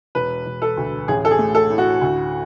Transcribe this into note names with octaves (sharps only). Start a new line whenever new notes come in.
E1 B4
E1
A4
D2
A1 G#4
A4
G#4
A3
A4
A2
F#4
D2